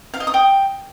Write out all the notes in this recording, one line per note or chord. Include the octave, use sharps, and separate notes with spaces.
F5
D#5
D#6
G5